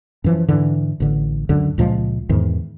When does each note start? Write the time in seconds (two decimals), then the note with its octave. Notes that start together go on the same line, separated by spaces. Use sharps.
0.24 F#2 E3 F3
0.48 G#2 D3 E3
1.00 A1 D3
1.49 C#2 F#2 D3
1.78 C#2 A#2 F3 G#3
2.29 E2 G#2 D#3 E3